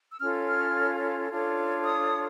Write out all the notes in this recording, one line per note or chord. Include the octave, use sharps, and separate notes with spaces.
E6
C#4 F4 A4 C#5 F6
F6
D4 F4 A4 C#5
D#6